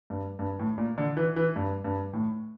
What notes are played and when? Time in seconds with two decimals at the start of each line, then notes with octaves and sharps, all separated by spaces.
0.10 G2
0.39 G2
0.59 A2
0.78 A#2
0.98 D3
1.17 E3
1.36 E3
1.56 G2
1.84 G2
2.13 A2